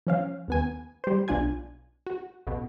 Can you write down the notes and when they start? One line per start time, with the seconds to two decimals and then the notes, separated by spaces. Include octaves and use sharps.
0.07 F3 C#4 F5
0.48 D#2 B3 G#5
1.04 G3 C5
1.28 B1 D4 F4 G#5 G#6
2.07 F#4
2.47 A1 B2